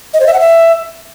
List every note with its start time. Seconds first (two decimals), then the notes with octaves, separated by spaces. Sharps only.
0.14 D#5
0.20 C5
0.27 E5
0.34 F#5
0.40 E5